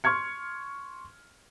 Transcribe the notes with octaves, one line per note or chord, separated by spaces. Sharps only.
C6 C#6 F6 G#6 C#7